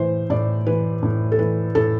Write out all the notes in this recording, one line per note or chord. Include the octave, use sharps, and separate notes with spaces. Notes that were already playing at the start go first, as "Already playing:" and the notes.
Already playing: A2 E3 C5
A2 D5
E3 B4
A2
A4
E3 B4
A2 A4